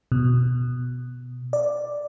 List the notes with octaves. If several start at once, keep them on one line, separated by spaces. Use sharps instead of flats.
B2
D5